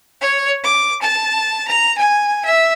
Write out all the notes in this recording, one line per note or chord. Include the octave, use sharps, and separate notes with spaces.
C#5
D6
A5
A#5
G#5
E5